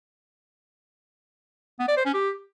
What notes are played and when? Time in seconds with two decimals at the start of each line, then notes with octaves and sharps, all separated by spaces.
1.80 B3
1.88 D5
1.97 C5
2.05 C#4
2.14 G4